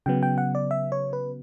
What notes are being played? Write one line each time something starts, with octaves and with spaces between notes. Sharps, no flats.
C#3 F#3 B3 G5
G5
F#5
D5
E5
C#5
B4